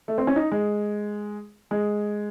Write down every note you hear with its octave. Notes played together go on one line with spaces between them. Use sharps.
A3
C4
C#4
D#4
G#3
G#3